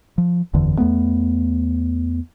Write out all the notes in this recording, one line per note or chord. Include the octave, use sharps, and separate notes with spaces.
F3
F#1 E2 D3 E3
E2 A3 B3